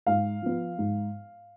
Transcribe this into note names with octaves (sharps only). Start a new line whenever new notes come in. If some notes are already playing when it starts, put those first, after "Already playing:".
G#2 F5
F3 B3
G#2